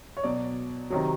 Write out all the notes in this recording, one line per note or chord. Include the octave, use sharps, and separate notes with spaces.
C#5
B2 F#3 D5
C3 D#3 F#3